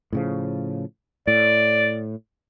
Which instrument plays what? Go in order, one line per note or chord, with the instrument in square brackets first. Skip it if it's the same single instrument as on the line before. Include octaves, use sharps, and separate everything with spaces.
[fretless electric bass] A2 C#3 F3
[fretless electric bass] A2 [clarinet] D5